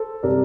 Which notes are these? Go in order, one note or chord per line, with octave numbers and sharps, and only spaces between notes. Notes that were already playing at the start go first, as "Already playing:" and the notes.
Already playing: A4 C5
C3 G3 A#4 D5